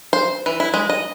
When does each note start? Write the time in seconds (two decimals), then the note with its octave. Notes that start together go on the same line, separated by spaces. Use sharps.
0.13 C5
0.46 E3
0.60 E4
0.74 G#3
0.89 D#5